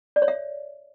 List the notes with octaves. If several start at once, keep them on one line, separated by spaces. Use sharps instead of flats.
D5
C#5
E5